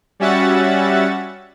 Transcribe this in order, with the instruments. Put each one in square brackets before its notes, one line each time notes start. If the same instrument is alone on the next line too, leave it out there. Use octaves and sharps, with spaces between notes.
[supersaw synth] G3 C#4 F#4 E5 F#5 A6